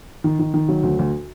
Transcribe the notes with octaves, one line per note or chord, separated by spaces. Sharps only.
D#3
D#3
D#3
F#3
D2
D2